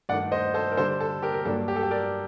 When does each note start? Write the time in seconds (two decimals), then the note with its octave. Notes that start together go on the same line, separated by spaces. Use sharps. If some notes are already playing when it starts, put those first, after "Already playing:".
0.09 G2 D#3 A3 D4 D5 F#5
0.32 C5 D#5
0.54 A4 C5
0.72 A#4
0.77 D3 G3 D4 A4 C5
1.00 A4
1.22 G4 A#4
1.34 A#4
1.45 G2 F#3 A#3 D4 A4
1.68 G4
1.76 A4
1.83 G4
1.91 A#4 D5